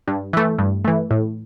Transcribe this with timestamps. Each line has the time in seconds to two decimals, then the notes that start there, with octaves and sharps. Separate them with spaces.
0.08 G2
0.33 E3 A3
0.59 G2
0.85 E3 A3
1.11 A2